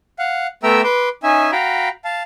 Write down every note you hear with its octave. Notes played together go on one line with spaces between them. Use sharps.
F5 F#5
A3 B3 E5 G5 A#5 E6
B4 C6 D6
C#4 D#4 E5 G#5
F#4 F5 G5 A#5 B5
F5 A5